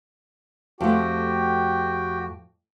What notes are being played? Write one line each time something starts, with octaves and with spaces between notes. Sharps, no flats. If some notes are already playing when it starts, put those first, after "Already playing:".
F2 A3 F#4 G4 G5